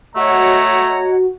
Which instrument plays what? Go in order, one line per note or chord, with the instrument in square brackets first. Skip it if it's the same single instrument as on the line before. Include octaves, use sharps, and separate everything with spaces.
[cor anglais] A3 [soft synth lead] F#4 [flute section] C#5 D#5 F#5 [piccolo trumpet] A#5